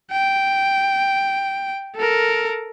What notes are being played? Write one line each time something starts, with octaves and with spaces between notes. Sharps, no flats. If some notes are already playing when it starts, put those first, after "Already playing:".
G5
A4 A#4